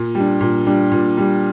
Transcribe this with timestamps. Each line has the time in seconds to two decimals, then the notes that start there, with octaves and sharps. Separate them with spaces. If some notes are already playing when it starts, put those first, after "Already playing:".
Already playing: A#2
0.15 G3 D4
0.41 A#2
0.67 G3 D4
0.92 A#2
1.17 G3 D4